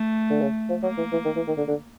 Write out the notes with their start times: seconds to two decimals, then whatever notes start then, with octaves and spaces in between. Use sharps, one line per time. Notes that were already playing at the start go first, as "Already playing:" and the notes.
Already playing: A3
0.30 D3
0.42 C#3
0.69 F3
0.83 F#3 A#3
0.98 E3
1.12 E3
1.25 D#3
1.36 E3
1.48 D#3
1.57 D3
1.68 D3